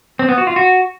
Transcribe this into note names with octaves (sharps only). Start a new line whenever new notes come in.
C4
B3
F#4
F4
F#4